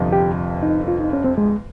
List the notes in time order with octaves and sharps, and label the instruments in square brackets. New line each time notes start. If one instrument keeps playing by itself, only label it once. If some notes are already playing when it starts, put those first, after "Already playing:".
Already playing: [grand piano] G1 F2 C3 F3
[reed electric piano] G4
D#4
F4
D#4
C#4
C4
G#3